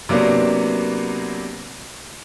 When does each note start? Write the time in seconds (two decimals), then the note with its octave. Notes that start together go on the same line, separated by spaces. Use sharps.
0.09 C3 F#3 A#3 B3 D4